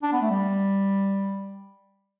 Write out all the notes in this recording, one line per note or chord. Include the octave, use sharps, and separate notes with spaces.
D4
B3
A3
G3